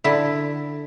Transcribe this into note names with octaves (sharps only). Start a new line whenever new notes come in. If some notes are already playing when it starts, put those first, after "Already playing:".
D3 E4